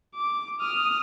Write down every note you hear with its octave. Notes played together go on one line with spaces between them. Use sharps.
D6
D#6 F6